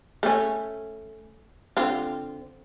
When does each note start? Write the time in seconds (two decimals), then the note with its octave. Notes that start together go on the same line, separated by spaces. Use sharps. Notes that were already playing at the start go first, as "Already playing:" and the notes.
0.23 A3 C#4
1.77 D3 C4 F4